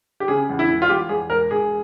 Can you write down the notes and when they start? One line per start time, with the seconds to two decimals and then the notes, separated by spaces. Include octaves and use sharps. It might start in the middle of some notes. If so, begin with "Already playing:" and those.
0.20 G4
0.28 C#3 G#4
0.49 E2
0.59 E4
0.69 E1
0.82 F4
0.89 E2 G4
1.09 E2 G#4
1.29 E1 A#4
1.51 E1 G#4